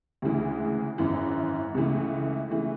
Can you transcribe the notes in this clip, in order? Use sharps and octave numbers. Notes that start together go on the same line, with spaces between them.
D2 C#3 E3 G#3
G#1 F#2 E3
C#2 C#3 E3 A3
C#3 E3 A3